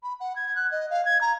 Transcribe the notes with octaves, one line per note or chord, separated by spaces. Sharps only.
B5
F#5
G#6
F#6
D#5
F5
G#6
A#5